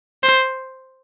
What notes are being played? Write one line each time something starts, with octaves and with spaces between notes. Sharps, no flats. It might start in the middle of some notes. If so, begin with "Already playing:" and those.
C5